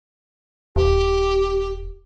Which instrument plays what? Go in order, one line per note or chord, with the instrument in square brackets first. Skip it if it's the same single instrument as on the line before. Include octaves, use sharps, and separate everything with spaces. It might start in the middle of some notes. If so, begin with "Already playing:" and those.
[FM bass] D#1 [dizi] G4